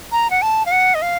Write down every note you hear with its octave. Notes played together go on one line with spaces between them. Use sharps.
A#5
F#5
A5
F5
F#5
D#5
F5